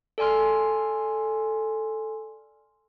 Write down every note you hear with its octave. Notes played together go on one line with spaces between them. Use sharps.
A4 D5 G#5 C6 F6